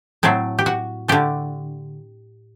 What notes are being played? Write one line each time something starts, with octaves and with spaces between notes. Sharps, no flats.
A2 F#3 A3 C4
G4
F#4
D3 A3 G4